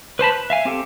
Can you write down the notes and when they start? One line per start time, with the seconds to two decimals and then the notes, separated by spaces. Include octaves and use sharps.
0.19 B4 C5 A5 B5
0.32 F#6
0.50 E5 F5 G#5
0.65 C4 G4 A4